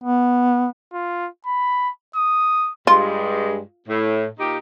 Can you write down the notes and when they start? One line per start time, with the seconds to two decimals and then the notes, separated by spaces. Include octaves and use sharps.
0.04 B3
0.94 F4
1.46 B5
2.16 D#6
2.87 G2 G#3 F4
3.88 A2
4.39 A#2 D#4 G4